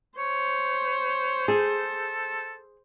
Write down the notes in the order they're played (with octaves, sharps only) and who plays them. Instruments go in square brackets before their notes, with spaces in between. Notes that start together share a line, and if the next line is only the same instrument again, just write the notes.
[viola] C5 [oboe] C#5
[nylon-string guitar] G#4 [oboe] A4